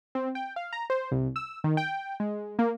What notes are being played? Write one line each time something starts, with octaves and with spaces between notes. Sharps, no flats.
C4
G5
F5
A#5
C5
C2
E6
D#3
G5
G#3
A#3